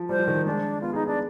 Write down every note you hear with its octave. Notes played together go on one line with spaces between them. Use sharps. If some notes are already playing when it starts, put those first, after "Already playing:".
Already playing: F3
G3 C5
F3
D#3
G#3 D4
B3 F4
D#4 G#4
D4 G#4